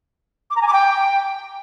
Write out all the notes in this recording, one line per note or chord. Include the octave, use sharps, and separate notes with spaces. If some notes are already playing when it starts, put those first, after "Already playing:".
D6
A#5
G#5
D6
G5